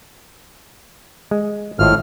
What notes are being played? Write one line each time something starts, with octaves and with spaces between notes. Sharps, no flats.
G#3
G#1 A2 F4 D#5 F6